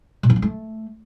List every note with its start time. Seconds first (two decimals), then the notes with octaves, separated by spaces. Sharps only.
0.23 B2
0.30 F3
0.36 C4
0.42 A3